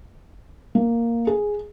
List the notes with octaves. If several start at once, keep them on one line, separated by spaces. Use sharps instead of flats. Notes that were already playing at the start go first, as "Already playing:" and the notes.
A#3
G#4